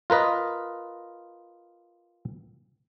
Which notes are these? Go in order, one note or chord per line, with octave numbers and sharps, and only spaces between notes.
F4 A#4 B4 D#5